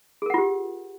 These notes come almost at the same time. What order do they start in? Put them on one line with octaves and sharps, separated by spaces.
G#4 A#4 F#5 F4 G4